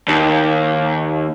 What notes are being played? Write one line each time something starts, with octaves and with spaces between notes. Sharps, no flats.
D#2